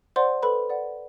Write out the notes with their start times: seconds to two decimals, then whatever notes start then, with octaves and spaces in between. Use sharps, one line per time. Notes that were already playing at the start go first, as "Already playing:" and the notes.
0.16 C5 D5 F#5 C6
0.43 A4 B4 B5
0.70 D5 F#5